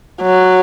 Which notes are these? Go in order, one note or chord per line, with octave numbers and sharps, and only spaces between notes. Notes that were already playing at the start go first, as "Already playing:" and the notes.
F#3